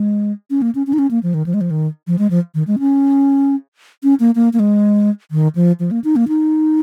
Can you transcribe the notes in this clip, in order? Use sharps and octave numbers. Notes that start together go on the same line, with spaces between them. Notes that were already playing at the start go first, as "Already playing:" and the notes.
Already playing: G#3
C#4
A#3
C#4
C#4
D#4
C#4
A#3
F3
D#3
F3
G#3
F3
D#3
F3
G#3
F3
D#3
G#3
C#4
C#4
A#3
A#3
A#3
G#3
D#3
F3
F3
A#3
D#4
A#3
D#4